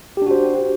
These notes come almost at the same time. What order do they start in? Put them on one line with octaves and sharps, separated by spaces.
G4 D4 F#4 C5